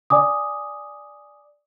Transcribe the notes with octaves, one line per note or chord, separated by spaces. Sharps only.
D5 G#5 D6 D#6